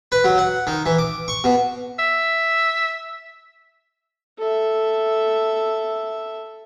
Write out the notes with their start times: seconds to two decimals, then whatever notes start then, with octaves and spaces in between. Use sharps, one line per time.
0.12 B4
0.24 F#3
0.38 F#5
0.67 D#3
0.86 E3
0.99 D6
1.28 C#6
1.44 B2
1.99 E5
4.39 A4 E5